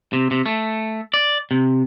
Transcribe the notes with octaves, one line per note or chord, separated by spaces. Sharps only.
C3
C3
A3
D5
C3